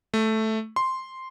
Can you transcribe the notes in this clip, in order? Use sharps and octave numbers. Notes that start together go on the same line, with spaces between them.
A3
C6